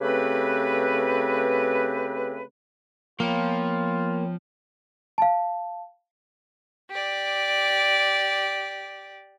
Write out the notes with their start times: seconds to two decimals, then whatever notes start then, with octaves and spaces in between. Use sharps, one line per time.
0.01 C#3 A3 C4 G4 B4
3.20 F3 A#3 B3 F4 C#5 G5
5.18 F5 A5
6.90 G4 D5